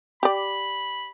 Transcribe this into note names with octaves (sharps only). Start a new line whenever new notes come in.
G4 D5 B5